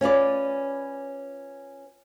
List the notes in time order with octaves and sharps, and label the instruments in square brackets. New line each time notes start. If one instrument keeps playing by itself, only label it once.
[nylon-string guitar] C#4 F4 B4 D5